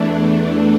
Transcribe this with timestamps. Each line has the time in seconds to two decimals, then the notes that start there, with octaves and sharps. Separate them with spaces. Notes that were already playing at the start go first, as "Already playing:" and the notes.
Already playing: E2 E3 A3 D4